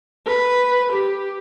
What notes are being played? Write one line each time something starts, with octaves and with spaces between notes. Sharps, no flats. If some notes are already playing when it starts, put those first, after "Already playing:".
B4
G4